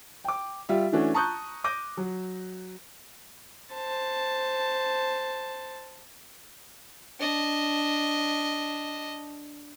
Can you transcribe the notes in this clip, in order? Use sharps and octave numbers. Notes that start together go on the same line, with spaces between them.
G5 D6
G3 F4 E5
E3 A3 C#4 D4 F#4
A5 A#5 C#6 D#6 F#6 G6
D6 G6 A#6 D#7
F#3
C5 A5
D4 D#5